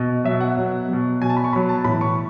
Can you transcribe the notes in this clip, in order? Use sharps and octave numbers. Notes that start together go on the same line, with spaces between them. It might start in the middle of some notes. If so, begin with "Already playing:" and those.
Already playing: B2 D#5
B2 F#3 E5
F#5
B2 F#3
B2 F#3
B2 F#3 G#5
A5
B5
C#6
B2 F#3 B5
A5
A2 E3 B5
C#6